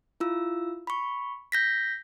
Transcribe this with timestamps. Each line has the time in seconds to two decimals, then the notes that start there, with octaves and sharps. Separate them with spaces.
0.20 E4 F4 E6
0.87 B5 C#6
1.52 G6 A#6 B6